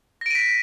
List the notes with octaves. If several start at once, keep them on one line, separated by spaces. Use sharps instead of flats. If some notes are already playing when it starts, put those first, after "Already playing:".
A#6 B6 D7 D#7